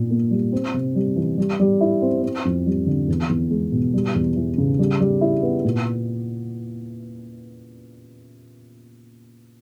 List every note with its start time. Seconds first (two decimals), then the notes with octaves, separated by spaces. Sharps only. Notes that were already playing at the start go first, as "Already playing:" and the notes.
Already playing: A#2
0.10 A#3
0.31 G3
0.52 C4
0.74 C3
0.95 G3
1.16 E3
1.38 G3
1.60 G3
1.81 E4
2.02 C4
2.23 C4
2.45 F2
2.66 G3
2.87 D3
3.08 E2
3.29 E2
3.51 G#3
3.72 B2
3.94 G3
4.15 E2
4.36 E3
4.58 C#3
4.79 G3
5.00 G3
5.21 E4
5.42 B3
5.65 A#2